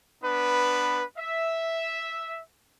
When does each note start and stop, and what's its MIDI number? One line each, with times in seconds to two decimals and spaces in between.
0.24 1.04 59
0.24 1.04 62
0.24 1.04 71
1.18 2.40 76